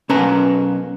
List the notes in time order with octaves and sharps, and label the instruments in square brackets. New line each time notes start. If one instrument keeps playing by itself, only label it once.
[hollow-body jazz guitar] B1 C#4 B4 A5 A#5